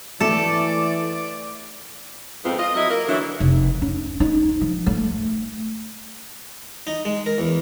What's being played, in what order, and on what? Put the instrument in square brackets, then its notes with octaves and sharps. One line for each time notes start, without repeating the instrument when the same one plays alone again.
[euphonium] E3 [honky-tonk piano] A3 [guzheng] A4 [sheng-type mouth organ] D5 D6
[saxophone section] F2 G#2 B3 C4 F4
F4 D#5
F#3 E4 D#5
A#3 A#4
D3 E3 F#3 D4 E4
[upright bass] F1
C#4
D#4
F3
A3
[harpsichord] D#4
G#3
A#4
E2